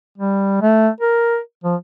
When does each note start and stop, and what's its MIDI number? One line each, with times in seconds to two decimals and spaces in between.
0.18 0.60 55
0.62 0.89 57
1.00 1.39 70
1.64 1.75 53